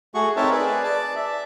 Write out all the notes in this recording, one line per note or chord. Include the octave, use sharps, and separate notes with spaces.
A3 F#4 G#4 C#6
C4 D#4 A#4 C#5 E5 A5
G#4 B4 D5
D5 A5
E5